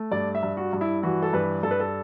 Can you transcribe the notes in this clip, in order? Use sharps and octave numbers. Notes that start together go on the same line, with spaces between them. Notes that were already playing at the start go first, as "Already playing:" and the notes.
Already playing: A3
G2 D5
E5
G2
F#4
G2
E4
E3 F#4
A4
G2 B4
G2 A4
B4
A4